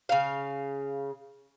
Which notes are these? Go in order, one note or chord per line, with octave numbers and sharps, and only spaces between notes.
C#3 F5